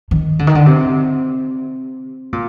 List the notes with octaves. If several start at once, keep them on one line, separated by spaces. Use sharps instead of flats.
D#3
D3
D#3
D3
C3
A#2